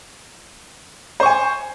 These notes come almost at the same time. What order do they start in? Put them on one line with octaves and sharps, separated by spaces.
C5 C#6 G#5